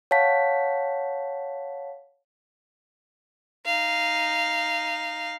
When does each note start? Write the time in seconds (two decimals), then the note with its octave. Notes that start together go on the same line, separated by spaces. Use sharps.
0.11 C#5 F5 F#5 A5 B6
3.66 D#4 F5